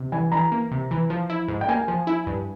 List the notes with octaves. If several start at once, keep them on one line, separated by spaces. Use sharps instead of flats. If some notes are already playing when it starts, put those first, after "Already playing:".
Already playing: C3
E3 G#5
E3 A#5
A#3
C3
E3
F3
E4
G#2
G5
A#3 G#5
F3
E4
G2